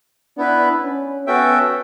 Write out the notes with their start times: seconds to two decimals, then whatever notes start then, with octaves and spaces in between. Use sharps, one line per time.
0.37 B3 D4 E4 B4
0.82 C#4
1.27 B3 C#4 F#4 A4 E5 G5